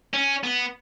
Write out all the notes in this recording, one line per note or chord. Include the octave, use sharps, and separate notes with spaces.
C#4
B3